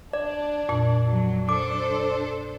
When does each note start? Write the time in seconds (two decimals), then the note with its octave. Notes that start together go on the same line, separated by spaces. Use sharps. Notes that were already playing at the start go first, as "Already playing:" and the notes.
0.13 D4 D5
0.69 F2 A#2 A5
1.09 F#3
1.49 D4 A4 C5 D6